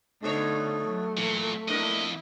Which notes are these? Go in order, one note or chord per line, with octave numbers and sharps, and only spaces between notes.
B2 D3 A3 B3 D#4 C#5
F#3
A#2 E3
F2 A#3 D4 E4 A#4 D#5